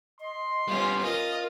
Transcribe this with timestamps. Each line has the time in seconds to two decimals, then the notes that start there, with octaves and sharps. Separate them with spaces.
0.21 D#5 C6
0.68 G3 B3 C#4 F4
1.03 F4 A#4 D#5